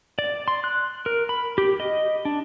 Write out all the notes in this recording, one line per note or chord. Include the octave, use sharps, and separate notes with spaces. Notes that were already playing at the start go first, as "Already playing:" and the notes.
D5
C6
F#6
A#4
B5
G4
D#5
D4